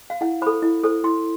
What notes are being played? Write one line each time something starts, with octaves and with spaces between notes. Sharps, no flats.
F5
E4 F#5
A4 C5 B5
E4
A4 C5
E4 C6